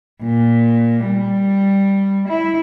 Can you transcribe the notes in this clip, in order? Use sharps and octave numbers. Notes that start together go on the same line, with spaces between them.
A#2
G3
E4